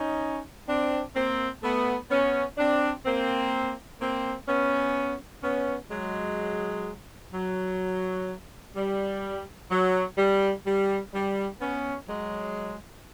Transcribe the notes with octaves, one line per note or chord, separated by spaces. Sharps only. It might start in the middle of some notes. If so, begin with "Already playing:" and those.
Already playing: C#4 D#4
C4 D4
A#3 C4
A3 B3
B3 C#4
C4 D4
A#3 C4
A#3 C4
B3 C#4
B3 C#4
F#3 G#3
F#3
G3
F#3
G3
G3
G3
B3 C#4
F#3 G#3